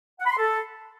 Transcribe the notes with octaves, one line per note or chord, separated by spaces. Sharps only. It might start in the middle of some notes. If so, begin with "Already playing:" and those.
F#5
B5
C6
A4